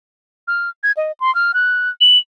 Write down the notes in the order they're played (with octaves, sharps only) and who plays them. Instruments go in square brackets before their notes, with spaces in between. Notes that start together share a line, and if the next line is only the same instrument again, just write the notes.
[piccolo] F6
G#6
D#5
C6
F6
F#6
F#7